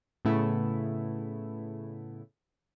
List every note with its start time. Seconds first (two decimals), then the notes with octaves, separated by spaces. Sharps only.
0.25 A2 C#3 A3 B3 E4